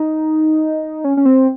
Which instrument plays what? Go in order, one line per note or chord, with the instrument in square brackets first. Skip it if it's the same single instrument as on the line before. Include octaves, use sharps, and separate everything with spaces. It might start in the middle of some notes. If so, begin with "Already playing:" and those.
Already playing: [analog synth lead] D#4
C#4
C#4
C4